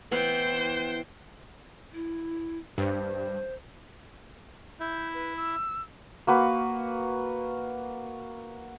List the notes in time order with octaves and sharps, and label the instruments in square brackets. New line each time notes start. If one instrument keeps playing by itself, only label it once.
[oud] E3 B3 [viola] C5 G5
[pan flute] E4
[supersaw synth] G2 [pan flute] C5
[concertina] E4 E5 [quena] G6
[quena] B4
E6
[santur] A#3 F#4 B4